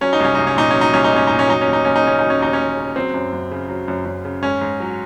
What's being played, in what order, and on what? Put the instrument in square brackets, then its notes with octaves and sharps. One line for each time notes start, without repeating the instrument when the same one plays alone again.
[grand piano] F#3 C#4
D#4
C2 C#4
C2 D#4
C#4
A#2 D#4
F#3 C#4
D#4
C2 C#4
D#4
C2 C#4
A#2 D#4
C#4
F#3 D#4
D#2 C#4
D#4
D#2 C#4
D#4
C#3 C#4
F#3 D#4
C#4
D#2 D#4
C#4
D#2
C#3
F#3 C4
F#2
F#2
C#3
F#3
F#2
F#2
C#3
G#2 C#4
G#2
F#3